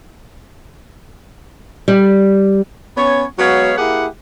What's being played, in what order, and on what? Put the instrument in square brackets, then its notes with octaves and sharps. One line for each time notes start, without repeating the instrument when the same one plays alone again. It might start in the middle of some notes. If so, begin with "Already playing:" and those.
[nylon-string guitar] G3
[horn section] B3 C#4 C#5
F#3 G#3 B3 C#5 F5
A#3 E4 G4 G#4 F#5